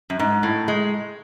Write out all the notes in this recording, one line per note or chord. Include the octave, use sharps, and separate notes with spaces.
F#2
G#2
A2
G#3